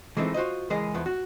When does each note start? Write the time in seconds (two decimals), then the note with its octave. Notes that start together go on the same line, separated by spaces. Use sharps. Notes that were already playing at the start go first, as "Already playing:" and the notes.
0.17 E3 F3 G#3 A3 C4 D#4
0.34 F4 F#4 C5 D#5
0.70 C#2 E3 G#3 G#4 A#4 D#5
0.94 E2 F3 B3
1.06 F#4